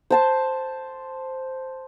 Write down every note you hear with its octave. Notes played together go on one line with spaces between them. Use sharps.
C5 A5 C6